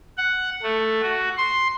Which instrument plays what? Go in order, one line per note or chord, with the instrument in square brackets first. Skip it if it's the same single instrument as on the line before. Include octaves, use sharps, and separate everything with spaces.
[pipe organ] F#5
A3
F#4
C6